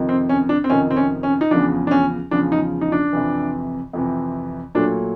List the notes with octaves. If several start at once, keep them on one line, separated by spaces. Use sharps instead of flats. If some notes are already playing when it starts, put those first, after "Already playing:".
Already playing: F2 C3 D#3
C4
C#4
D4
C4
F2 C3 D#3 C#4
C4
C#4
C#4
D#4
E2 C#3 F3 D4
D4
C#4
E2 C#3 F3 D4
D#4
D#4
D4
F2 C3 E3
F2 C3 E3
A#2 F#3 A3 D4